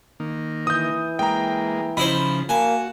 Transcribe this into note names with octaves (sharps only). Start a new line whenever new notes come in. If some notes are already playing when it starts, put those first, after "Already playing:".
D#3 A#3
E3 D#6 G6
G#3 A#3 G5 A#5
C#3 F3 D#4 E4 C5 B5
A#3 F#4 G#5 A5